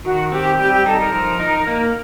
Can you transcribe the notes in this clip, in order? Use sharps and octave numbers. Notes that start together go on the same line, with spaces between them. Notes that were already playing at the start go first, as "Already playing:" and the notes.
D#3 F#4
C4 G4
G3 G4
G4
D#4 A4
A#4
F3
D#4
A#3